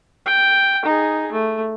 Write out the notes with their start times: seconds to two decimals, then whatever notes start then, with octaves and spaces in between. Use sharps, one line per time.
0.26 G5
0.85 D#4 G#4
1.32 A3